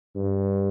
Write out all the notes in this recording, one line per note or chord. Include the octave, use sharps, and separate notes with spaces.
G2